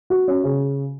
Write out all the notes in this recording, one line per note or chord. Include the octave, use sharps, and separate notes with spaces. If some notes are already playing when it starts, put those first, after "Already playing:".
F#4
C#4
C#3